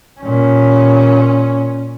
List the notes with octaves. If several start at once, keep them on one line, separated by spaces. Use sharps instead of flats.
A#2 C#4